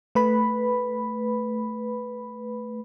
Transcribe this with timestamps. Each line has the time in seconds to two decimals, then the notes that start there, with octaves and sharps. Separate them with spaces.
0.15 A3 B4 B5